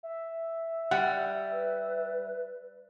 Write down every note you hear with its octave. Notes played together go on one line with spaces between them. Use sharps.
E5
G3 F#5
B4